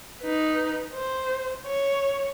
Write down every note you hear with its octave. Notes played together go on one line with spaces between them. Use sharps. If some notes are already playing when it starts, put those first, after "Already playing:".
D#4 B4
C5
C#5